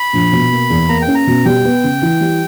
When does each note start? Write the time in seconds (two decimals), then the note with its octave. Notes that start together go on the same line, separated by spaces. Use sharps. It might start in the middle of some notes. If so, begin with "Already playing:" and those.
Already playing: B5
0.13 A#1
0.33 B2
0.51 A#3
0.70 E2
0.88 A#3 A#5
1.02 G5
1.08 C#4
1.15 A#5
1.27 B2
1.45 G3 G5
1.64 B3
1.83 C#3
2.02 E3
2.21 G3